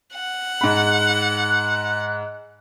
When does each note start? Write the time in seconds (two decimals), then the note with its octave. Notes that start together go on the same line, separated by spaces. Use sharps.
0.14 F#5
0.61 G#2 B5 F#6